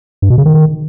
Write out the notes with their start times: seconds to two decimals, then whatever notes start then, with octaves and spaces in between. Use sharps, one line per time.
0.22 G2
0.30 B2
0.38 C#3
0.46 D#3